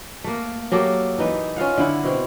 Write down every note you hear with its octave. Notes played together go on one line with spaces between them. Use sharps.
A3 A#3
F#3 A#3 G4 A4
E3 D#4 B4
C#4 F4 F5 F#5
D3 E4 F#5
B2 C4